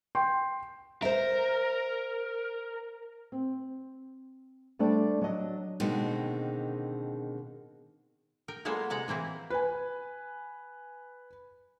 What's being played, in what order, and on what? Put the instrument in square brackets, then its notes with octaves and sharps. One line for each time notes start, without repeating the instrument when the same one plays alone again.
[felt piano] G5 C6
[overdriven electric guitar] A#4 [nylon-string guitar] C5 E5
[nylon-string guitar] C4
G3 A3 D4 A4 C5 D5
F#3 D4 D#5
[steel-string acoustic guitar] B2 D3 D#3 G#3 A#3 C4
[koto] A#4 G5
F#3 G#3 A#3 B3 F4 A4
C3 G#3 F#5 A#5
E3 A#3 C4 E4
[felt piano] B4 G#5